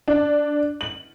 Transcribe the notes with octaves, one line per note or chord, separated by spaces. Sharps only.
D4
F#7